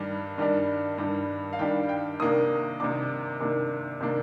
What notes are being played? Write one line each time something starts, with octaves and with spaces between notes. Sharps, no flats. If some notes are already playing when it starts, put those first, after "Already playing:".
Already playing: G2 D#3 G3 D4
G2 D#3 G3 D4
G2 D#3 G3 D4
F5
G2 D#3 G3 D4 G5
G5
C3 D#3 A#3 D4 D#6
C3 D#3 A#3 D4 D6
C3 D#3 A#3 D4
C3 D#3 A#3 D4